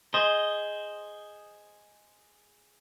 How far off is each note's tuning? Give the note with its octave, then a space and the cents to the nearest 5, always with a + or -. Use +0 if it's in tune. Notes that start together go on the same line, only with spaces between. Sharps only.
G#4 +0 C5 +0 D#5 +0